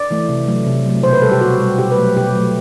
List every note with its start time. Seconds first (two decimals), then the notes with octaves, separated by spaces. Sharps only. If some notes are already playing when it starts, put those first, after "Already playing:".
Already playing: D5
0.10 E3 A3
0.29 C3
0.47 F#3 A3
0.66 C3
0.86 F#3 A3
1.03 B2 C5
1.13 B4
1.22 G3 A4
1.32 G4
1.41 B2 F#4
1.60 G3
1.78 B2 G4
1.92 B4
1.98 F#3 A3
2.17 B2 G4
2.35 F#3 A3